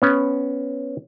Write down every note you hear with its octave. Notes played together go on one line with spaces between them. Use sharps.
B3 C#4